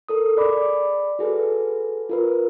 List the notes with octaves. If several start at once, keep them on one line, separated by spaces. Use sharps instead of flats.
A4 A#4 D#6
G#4 D5 B5 D6
F#4 G#4 A4 B4
F4 A#4 B4